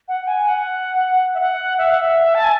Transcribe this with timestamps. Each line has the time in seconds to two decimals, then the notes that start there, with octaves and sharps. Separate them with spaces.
0.08 F#5
0.27 G#5
0.46 F#5
1.34 E5
1.40 F#5
1.78 E5
1.90 F#5
2.01 E5
2.35 A5
2.44 G#5